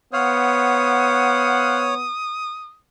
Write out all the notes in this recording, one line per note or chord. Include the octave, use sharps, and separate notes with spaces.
B3 C5 C#5 F5 F#5 D#6